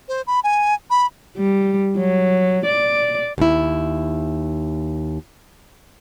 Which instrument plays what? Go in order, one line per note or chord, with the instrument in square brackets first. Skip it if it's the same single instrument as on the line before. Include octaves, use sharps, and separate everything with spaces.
[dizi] C5
B5
G#5
B5
[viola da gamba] G3
F#3
D5
[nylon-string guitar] D#2 E4